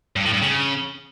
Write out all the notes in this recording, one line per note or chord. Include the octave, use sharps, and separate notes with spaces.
G2
A2
G2
C#3